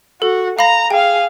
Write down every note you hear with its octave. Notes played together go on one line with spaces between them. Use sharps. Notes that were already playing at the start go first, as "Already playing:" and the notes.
F#4 A4
F5 A#5 B5 A#6
G#4 F5 G5